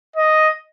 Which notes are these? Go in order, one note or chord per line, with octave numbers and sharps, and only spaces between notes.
D#5